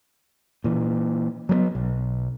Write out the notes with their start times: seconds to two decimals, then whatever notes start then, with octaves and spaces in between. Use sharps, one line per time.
0.64 A#2 E3
1.49 F#3 A3 B3
1.75 B1